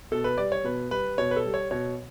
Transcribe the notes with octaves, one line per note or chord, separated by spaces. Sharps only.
B2 A4
B4
G3 D5
C#5
B2 B4
G3 B4
B2 C#5
B4
A4
G3
C#5
B2 C#5